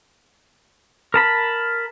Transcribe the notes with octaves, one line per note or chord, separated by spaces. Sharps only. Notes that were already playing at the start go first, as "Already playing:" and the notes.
A#4 A5 B5